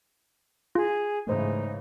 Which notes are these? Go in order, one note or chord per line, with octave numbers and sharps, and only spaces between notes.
F4 G#4
G#2 C#3 E3 A3 D#4 C5